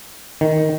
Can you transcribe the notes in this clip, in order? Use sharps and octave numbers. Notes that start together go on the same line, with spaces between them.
D#3